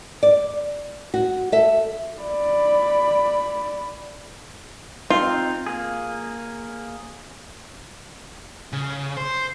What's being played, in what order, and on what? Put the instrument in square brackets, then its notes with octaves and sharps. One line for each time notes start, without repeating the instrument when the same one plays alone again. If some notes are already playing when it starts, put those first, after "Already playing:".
[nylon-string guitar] D5
F#4
A4 E5
[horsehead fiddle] D5 B5
[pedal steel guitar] C4 D#4 [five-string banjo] F4
[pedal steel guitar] A#3 G#4
[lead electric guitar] C#3
C5